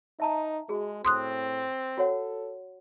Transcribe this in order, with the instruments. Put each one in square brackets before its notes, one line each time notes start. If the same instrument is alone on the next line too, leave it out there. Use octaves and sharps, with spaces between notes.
[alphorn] D#4 [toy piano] E5 A5 A#5
[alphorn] G#3 [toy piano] F#4 G#4
[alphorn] A2 [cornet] C4 [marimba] C6 D#6 F#6
[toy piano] F#4 C#5 F#5 [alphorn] A4